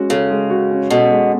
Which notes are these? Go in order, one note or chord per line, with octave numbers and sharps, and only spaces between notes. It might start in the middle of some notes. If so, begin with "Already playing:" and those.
Already playing: G#3 C#4 F#4
C#3 A4
G#3
F#4
C#4
B2 A4
G#3